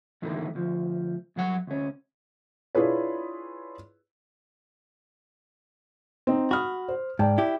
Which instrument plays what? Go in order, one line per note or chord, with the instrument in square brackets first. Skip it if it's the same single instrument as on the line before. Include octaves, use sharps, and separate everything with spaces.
[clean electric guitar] E2 A2 D3 D#3 A3 A#3
D2 F3
G2 F#3 F#5
D2 C#4
[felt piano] D4 E4 F4 G#4 B4 C#5
C4 D#4
[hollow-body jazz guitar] F#4 [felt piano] B5 D#6 F6
[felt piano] C5
[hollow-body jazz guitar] G#2 [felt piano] D5 G5 A5
[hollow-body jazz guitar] E4 G4